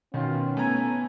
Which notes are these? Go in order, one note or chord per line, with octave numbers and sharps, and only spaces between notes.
B2 D#3 C#4 F4
A3 B3 G#5 A#5